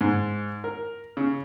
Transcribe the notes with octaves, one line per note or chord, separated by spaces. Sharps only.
G#2
A#4
C#3